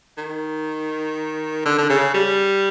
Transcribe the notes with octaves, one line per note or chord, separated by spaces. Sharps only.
D#3
D3
D3
C#3
G3